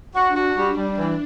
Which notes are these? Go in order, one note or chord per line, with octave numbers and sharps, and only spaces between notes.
D4 F#4
F#4
G3
G3
E3